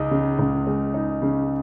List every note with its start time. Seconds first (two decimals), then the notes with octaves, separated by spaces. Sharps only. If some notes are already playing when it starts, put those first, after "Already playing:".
Already playing: C#2 G#3 D#4
0.11 C#3
0.39 C#2
0.67 G#3
0.94 D#4
1.22 C#3